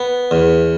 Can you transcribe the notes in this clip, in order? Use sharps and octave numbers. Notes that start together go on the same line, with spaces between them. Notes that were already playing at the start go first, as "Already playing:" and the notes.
Already playing: B3
E2